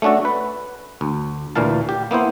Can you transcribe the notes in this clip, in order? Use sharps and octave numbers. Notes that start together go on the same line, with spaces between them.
A3 C#4 D4 F#4 A4
B4
D2
D2 A#2 E3 A#3 F5 A5
G4
A#3 B3 E4 C5